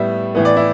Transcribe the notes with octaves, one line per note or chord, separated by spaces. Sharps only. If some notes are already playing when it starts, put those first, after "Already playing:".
Already playing: A2 G3 B3 E5
A2 E3 B3
D5
E4